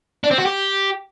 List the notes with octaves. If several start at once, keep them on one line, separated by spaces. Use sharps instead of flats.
D4
C4
F#4
G4